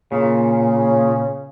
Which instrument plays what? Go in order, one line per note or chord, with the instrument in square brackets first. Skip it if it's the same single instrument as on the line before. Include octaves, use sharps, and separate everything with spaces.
[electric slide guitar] A#2 [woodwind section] C#3